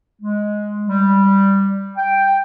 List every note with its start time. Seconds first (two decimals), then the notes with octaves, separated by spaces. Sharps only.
0.22 G#3
0.88 G3
1.97 G5